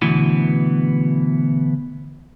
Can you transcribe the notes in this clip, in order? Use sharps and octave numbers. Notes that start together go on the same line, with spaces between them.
D2 B2 E3 B3